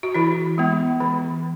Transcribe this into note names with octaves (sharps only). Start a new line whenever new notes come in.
F#4
E3 E4
G#3 B3
E3